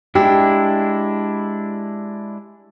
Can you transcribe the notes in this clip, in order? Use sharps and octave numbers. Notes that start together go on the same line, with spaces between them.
G#3 D4 E4 G4